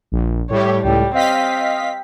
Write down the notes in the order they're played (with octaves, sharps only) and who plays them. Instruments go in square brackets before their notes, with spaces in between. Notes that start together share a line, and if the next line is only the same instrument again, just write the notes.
[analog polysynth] A#1
[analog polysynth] A2 G3 G4 [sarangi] C#5
[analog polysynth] C#2 A2 [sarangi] G3
[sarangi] C4 [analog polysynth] D#5 F5 B6